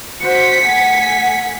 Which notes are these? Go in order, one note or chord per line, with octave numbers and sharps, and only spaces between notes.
F#4 C5 B6 C#7
A3 F#5 G#5